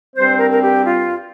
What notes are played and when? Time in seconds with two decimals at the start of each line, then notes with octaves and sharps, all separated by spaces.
0.16 G2 G3 C4 C5
0.38 A#4
0.51 A#4
0.62 G4
0.85 F4